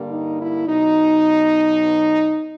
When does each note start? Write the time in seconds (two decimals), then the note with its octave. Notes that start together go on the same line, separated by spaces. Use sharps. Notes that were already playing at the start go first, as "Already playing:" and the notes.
Already playing: G2 D3 G3 A#3
0.09 D#4
0.38 E4
0.67 B2 F#3 B3 D#4